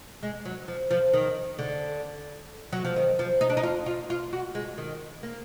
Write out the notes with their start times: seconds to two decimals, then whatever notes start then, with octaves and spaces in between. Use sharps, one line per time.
0.23 G#3
0.45 F#3
0.68 F3
0.91 F3
1.13 D#3
1.59 D3
2.73 F#3
2.85 F3
2.96 D#3
3.19 F3
3.41 D#4
3.50 D4
3.57 D#4
3.63 F4
3.86 F4
4.10 F4
4.33 F#4
4.55 G#3
4.78 D#3
5.23 A#3